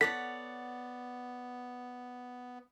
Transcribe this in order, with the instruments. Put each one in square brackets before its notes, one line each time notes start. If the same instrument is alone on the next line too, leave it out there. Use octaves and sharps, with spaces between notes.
[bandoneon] B3 [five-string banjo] A4 [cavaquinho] C#5 D5 F#5 [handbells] B6